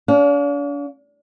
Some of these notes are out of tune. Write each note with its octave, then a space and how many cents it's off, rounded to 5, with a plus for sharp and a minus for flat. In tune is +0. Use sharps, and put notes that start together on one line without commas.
D4 -45 F5 +25